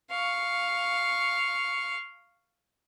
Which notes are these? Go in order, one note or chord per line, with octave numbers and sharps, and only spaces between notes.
F5 C#6